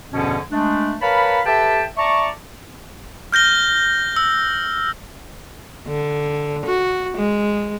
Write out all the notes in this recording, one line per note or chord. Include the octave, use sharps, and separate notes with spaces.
E2 G2 B2 D3 F3 C#4
G#3 A3 D4
A#4 B4 C#5 F5 A5 B5
G4 A4 B4 E5 G5 A5
D5 E5 A5 A#5 C#6
F6 G6 A#6 G7
E6
D3
F#4
G#3